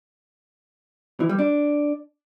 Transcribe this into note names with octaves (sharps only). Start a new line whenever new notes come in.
E3
G3
D4